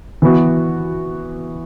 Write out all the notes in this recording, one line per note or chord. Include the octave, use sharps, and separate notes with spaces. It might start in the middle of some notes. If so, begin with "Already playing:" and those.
E3 B3 F#4